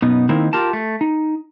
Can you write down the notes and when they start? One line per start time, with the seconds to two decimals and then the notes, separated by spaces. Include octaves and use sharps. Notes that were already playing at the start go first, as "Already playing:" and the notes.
0.02 F#2 B2 B3 D#4
0.29 D#3 A#3 C4 D#4 E4
0.53 F4 G4 A#4 A5
0.73 A3
1.01 D#4